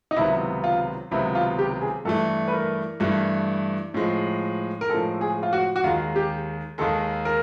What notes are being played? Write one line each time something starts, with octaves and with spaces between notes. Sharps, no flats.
D#4
C#2 C3 D#3 F#3 B3 E4
F4
C#2 C3 D#3 F#3 B3 E4
F4
G4
G#4
G2 E3 A3 A4
B4
A#4
G2 E3 A3
A2 F3 G#3
A#4
A2 F3 G#3 A4
G#4
F4
F#4
F#4
D#2 D#3 G#3 F4
G4
D#2 D#3 G#3 A4
A#4